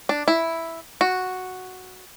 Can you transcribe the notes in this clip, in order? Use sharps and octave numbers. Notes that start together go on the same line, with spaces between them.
D4
E4
F#4